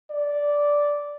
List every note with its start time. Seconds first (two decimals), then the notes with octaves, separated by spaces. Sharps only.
0.10 D5